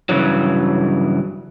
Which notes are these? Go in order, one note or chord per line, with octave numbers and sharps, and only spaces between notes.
G2 C#3 E3 F#3